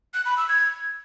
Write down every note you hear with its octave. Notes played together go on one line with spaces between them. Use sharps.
F#6
B5
E6
G#6